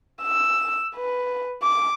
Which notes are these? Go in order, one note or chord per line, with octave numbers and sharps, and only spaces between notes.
E6
B4
D6